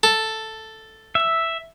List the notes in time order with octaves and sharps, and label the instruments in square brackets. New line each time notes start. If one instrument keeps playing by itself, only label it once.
[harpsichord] A4
[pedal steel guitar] E5